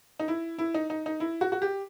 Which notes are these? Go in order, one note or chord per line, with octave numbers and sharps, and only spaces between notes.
D#4
E4
E4
D#4
D#4
D#4
E4
F#4
F#4
G4